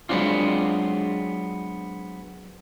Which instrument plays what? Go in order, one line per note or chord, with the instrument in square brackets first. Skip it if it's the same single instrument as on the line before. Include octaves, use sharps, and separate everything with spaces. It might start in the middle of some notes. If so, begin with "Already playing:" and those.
[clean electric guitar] F#3 G#3 B3 C4 D4 F4